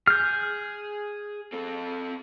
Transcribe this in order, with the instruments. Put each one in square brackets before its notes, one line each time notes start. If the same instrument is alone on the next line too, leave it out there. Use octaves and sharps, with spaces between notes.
[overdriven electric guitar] G#4 [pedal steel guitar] F6 G6
[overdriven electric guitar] C4 A4